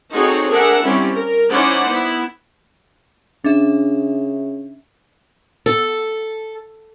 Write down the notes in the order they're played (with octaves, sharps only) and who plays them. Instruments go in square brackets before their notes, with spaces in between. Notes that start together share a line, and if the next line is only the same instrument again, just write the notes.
[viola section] C4 D#4 F#4 G#4 A4 C#5
D4 G#4 A#4 E5 F#5
G3 C4 C#4 E4
A#4
C#4 D#4 E4 C5 D5 F#5
B3 E4
[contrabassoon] C#3 [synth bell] D4 E5
[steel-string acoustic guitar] A4